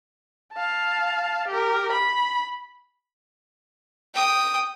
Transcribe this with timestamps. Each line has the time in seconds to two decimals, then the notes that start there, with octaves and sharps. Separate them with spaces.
0.53 F5 A5
1.48 G4 A#4
1.92 B5
4.14 G5 D#6